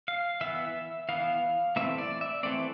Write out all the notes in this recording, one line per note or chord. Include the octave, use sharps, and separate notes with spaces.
F5
E3 B3 E5
E3 B3 F5
E3 A3 C4 E5
D5
E5
E3 A3 C4 D5